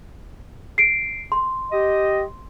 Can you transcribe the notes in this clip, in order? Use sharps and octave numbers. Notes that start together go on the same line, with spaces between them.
C7 D7
C6
G4 D#5